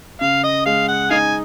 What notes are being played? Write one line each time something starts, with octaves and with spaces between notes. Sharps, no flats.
C#3 F5
D#5
G#3 F5
F#5
D#4 F5 G#5